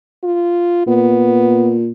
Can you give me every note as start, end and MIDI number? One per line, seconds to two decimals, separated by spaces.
0.24 0.87 65
0.87 1.92 46
0.87 1.74 59